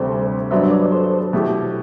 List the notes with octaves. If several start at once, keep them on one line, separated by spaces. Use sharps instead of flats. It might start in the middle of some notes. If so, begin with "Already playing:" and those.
Already playing: D2 C3 G3 C4 G4 A4 C5
G2 F#3 B3 D4 C5 E5
B4 D5
A4 C5
B2 A3 E4 G4